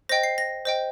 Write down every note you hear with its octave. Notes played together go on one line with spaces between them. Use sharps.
C5 D#5 G5 A#6
C7
A#6
C5 D#5 G5